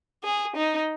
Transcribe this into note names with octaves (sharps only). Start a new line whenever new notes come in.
G#4
D#4